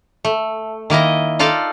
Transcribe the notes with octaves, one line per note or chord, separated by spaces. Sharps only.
A3
D#3 A#3 E4 D#5
D#4 F4 A4 D5 F5